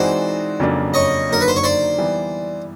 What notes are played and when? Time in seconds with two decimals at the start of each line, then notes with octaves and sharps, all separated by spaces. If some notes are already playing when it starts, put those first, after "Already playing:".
Already playing: E3 G#3 C4 D#4 F#4 C5 D5
0.60 F2 C#3 F#3 A#3 D4
0.94 C#5 D#5
1.29 D3 F#3 A#3 D#4 A#4
1.41 B4
1.48 C5
1.56 C#5
1.64 C5 D5
1.98 E3 G3 B3